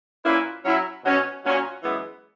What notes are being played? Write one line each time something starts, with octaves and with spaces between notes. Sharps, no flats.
A#2 A#3 C#4 E4 B4
F#3 C#4 E4
B2 F#3 C#4 F#4
A#2 F#3 C#4 F#4 C#5
F#2 E3 G#3 B3 E4